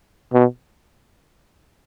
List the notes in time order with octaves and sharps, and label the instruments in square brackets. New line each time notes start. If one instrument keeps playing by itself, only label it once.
[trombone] B2